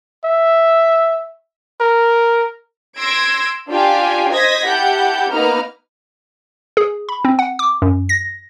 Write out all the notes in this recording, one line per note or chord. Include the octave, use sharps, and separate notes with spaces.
E5
A#4
C6 E6 G#6 A#6 D7
D4 F4 G4 F5 G5 G#5
C5 D#5 G#6 A#6 B6
E4 G4 F#5 A5 G6
A#3 B3 D#4 B4 A#5 F6
G#4
B5
C4
F#5
D6
F#2
A#6